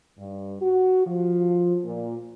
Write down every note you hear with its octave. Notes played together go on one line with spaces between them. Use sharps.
G2
F#4
F3
A#2